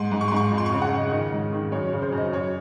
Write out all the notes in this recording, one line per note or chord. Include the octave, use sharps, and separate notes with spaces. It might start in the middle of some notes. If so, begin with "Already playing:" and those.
Already playing: G#2 C6
G#2
C#6
C6
G#2 C#6
F2
C6
C#6
C#3
F#5
C#3
D#5
D#3 D#5
G#2
D#3
F#2 C#5
C#5
C#3
C5
F#2
D#5
F#2 C#5